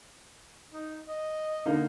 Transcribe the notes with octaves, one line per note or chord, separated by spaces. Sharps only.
D#4
D#5
D3 A#3 D#4